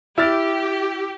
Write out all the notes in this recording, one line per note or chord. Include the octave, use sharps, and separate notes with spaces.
E4 G4 F6 A6